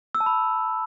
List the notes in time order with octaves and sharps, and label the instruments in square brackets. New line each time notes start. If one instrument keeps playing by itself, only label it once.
[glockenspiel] E6
A5
B5